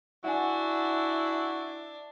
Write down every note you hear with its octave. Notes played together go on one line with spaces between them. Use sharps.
D4 E4 F#4 F#5 G#5